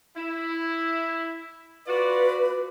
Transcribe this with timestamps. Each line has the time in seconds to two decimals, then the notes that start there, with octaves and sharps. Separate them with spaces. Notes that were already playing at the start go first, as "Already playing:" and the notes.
0.17 E4
1.87 F4 F#4 B4 D5